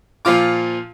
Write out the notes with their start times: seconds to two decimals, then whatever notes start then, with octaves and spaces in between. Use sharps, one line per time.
0.25 A#2 F3 F4 D6